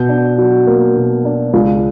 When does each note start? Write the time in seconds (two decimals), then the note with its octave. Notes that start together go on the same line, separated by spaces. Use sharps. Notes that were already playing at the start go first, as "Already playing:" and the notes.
Already playing: B2 G6
0.09 D4
0.38 F#3
0.67 A#3
0.96 B2
1.25 D4
1.54 C#2